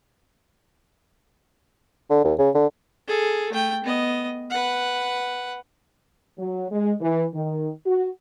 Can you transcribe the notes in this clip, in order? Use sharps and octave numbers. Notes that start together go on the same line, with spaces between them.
D3
D#2
C#3
D3
G#4 A4
A3 G5
B3 D#5
B4 F#5
F#3
G#3
E3
D#3
F#4